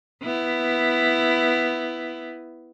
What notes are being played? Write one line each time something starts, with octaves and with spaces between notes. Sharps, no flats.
B3 E4